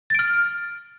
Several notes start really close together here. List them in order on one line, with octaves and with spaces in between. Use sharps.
A6 D7 F6